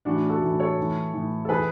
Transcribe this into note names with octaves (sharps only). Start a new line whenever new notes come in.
A2 E3 D4 F#4
F#4 A4
A2 E3
A4 C#5
A2 E3
A2 E3
A4
E3 G#4 B4